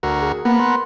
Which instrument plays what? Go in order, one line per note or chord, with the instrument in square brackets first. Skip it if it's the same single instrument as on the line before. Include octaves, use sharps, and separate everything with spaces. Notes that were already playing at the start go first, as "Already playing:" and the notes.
[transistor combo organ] D2 F#4 A#4
[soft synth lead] G#4
[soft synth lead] A#3 [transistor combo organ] B3 A#4 F#5
[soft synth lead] C6